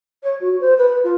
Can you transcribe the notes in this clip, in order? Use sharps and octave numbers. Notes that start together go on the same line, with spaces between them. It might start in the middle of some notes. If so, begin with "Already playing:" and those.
C#5
F#4
C5
B4
F4